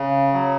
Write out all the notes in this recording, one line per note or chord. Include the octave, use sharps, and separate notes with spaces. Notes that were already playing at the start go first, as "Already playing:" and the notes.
Already playing: C#3
F#3